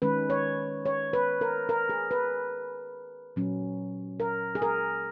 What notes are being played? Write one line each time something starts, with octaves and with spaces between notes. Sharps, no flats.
D#3 G#3 C#4 B4
C#5
C#5
B4
A#4
A#4
G#4
B4
A#2 F#3 C#4
A#4
G#4
A#4